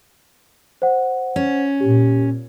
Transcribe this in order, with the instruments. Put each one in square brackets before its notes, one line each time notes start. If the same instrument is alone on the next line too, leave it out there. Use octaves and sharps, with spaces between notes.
[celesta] C5 F#5
[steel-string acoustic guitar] C#4
[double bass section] A#2 [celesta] G4